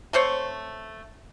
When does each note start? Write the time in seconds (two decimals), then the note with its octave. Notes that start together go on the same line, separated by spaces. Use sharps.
0.13 A3 C4 C5 C#5